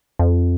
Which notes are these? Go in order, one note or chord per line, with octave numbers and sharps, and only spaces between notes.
F2